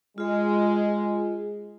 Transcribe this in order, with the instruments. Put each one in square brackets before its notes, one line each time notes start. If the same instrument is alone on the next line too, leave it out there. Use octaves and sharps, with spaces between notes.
[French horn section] G#3 [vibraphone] F4 G#4